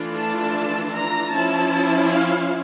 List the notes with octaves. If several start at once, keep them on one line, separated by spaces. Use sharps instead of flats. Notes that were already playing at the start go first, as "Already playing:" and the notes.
Already playing: E3 A3 D4 F4
A5
A#5
F3 C#4 E4 A5
F5